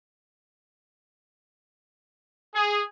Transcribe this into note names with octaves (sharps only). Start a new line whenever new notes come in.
G#4